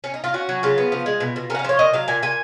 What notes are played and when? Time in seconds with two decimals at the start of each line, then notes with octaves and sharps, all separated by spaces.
0.04 C#4
0.14 D#4
0.24 F4
0.34 C#4 F#4
0.49 F#3
0.63 C#3 F4
0.78 B3
0.92 F3
1.06 G#3
1.20 B2
1.36 B2
1.50 C#4 A#4
1.55 F#5
1.59 F5
1.64 F3 C#5
1.79 A#2 D#5
1.93 F#3 F5
2.08 A#2 G#5
2.23 A#2 G#5